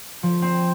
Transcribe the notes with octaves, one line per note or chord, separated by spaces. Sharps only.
F3
C4